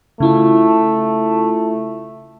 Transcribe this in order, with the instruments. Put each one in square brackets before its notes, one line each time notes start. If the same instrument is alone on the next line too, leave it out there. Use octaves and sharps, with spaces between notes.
[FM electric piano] C#3 E4 F4 [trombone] A3